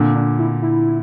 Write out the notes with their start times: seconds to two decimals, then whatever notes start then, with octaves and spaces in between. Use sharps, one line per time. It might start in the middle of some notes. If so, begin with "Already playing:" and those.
Already playing: A#2 D3
0.15 D4
0.39 E4
0.62 E4